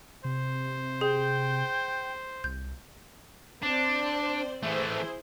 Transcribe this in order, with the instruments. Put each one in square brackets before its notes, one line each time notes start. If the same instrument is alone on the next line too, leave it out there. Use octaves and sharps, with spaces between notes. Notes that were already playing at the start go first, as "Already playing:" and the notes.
[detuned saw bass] C3 [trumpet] C5
[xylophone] G#4 [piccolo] G5
[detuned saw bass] C2 [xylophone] G6
[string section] C4 C5 D5 [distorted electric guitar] D4
[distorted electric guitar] E3 A3 [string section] E4 G#4 C5